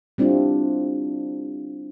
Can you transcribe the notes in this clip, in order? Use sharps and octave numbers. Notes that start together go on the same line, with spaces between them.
G3 C4 D4 E4 F4